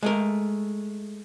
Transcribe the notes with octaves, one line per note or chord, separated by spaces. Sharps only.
G#3 A3 A#4